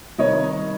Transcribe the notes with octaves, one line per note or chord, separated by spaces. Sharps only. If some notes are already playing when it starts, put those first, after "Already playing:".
C3 D#3 G3 C#5 D#5